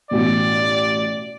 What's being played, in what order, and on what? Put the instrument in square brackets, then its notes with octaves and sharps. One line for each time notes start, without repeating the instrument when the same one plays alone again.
[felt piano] A1 B2 [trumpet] D5